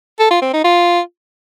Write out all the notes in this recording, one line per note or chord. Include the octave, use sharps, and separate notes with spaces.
A4
F4
C4
D#4
F4